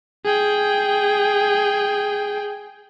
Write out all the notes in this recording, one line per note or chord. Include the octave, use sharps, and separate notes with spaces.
G#4 G5